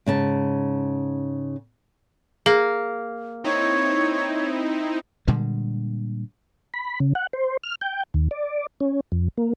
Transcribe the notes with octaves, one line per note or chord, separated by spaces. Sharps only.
G#2 C#3 A5
A#3 G#4
C4 D#4 E4 C#5
A#2 D3 G3 G#3
B5
C#3
F#5
C5
F6
G5
D#2
D5
C#4
F2
A#3